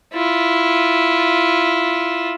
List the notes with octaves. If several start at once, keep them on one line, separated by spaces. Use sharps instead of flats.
E4 F4